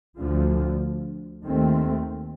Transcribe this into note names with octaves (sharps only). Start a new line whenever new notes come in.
D2 D3 F3
D#2 D#3 A3 C4